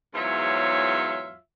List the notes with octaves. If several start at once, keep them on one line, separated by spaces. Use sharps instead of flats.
E2 G#2 F#3 F4 C#5 E5